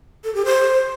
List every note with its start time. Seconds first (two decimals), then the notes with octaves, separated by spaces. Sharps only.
0.24 A4
0.35 G4
0.45 C5